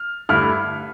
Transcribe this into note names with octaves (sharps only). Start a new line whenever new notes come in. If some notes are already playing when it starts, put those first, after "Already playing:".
Already playing: F6
G2 D3 A3 E4 F6